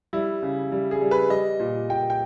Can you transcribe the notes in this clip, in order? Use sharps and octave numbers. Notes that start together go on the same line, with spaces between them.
G3 E4
C#3
G3
G#4
G3
B4
G3 D#5
A#2
A#2 G5
G5